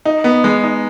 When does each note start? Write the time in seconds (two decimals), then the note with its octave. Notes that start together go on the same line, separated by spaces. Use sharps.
0.06 D#4
0.24 B3
0.44 G#3
0.64 D#4